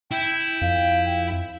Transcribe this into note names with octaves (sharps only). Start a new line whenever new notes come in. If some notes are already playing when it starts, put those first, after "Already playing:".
E4 G5
F2 F5